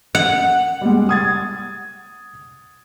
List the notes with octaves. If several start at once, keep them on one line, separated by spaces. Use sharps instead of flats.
F#5
G3 G#3
D#6 G#6 A6